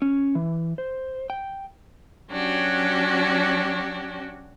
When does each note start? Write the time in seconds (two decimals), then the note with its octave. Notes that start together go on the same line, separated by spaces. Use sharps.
0.02 C#4
0.35 E3
0.78 C5
1.30 G5
2.32 F#3 C#4 D4 F#4 G4